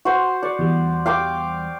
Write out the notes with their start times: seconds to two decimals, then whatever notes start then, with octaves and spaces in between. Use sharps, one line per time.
0.05 F#4 C5
0.43 D5 F#5 C#6
0.59 E2 G3
1.06 F5 G5 D6